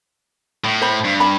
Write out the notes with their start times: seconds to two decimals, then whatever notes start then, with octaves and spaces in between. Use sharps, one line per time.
0.64 A2
0.81 C5 B5
1.05 G2
1.20 B5